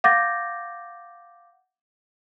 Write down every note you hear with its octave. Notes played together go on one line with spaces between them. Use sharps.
F5 F#5 D6 G6 A6 A#6